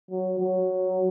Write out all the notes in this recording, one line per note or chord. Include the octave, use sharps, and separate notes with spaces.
F#3
F#3